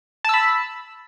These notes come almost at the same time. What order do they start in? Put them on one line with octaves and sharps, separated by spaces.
A5 E6 B5